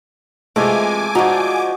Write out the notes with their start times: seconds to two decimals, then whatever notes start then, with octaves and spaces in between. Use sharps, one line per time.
0.56 C3 E3 G#3 A3 F4 G#5 D6
1.15 F3 D4 D#4 F#4